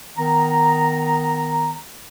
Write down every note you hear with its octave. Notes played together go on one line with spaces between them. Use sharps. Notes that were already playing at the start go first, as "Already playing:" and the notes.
D#3 B3 A#5